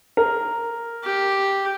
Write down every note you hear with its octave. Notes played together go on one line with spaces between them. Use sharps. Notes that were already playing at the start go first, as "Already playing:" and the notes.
A#4
G4